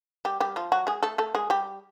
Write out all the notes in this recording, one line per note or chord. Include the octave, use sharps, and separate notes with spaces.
G3 G4
G3 G4
F3 F4
F#3 F#4
G#3 G#4
A3 A4
A3 A4
G#3 G#4
G3 G4